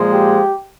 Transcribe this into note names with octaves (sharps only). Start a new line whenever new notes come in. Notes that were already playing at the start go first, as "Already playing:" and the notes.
Already playing: A#2 F3 G#3
G4